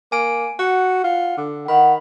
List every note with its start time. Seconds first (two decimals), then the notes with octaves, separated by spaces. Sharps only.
0.12 A#3 G#5 D7
0.59 F#4 F#5
1.04 F4
1.37 D3
1.68 D#3 F#5 B5